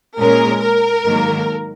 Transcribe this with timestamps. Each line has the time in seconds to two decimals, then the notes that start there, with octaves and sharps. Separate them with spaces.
0.19 A#2 G#3 C#4 A#4
0.61 A#4
1.04 G#2 D#3 F#3 A#3